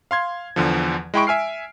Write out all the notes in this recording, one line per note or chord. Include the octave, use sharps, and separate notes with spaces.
F5 C6 G#6
E2 D3 F3
G#3 E4 G5 B5 C#6 D7
E5 G#5 F6 C7